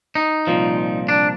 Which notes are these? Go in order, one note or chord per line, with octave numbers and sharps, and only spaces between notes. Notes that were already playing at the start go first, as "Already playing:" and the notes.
D#4
C2 A#2 F3
D4